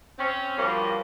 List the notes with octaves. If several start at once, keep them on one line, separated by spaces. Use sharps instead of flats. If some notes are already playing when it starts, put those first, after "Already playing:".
C4 C#4
G2 F3 G3 A#3 C#4 F#4